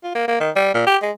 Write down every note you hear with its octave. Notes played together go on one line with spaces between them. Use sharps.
F4
A#3
A#3
D#3
G3
A#2
G4
G#3